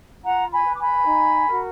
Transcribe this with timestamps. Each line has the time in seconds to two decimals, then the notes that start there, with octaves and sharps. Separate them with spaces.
0.24 F4 F#5 A#5
0.52 G#5 B5
0.65 B4
0.74 D6
0.79 G#5 B5
1.07 D#4
1.48 F#4 A#4